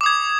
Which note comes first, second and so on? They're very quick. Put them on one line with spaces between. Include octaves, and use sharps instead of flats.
D6 D#6 G#6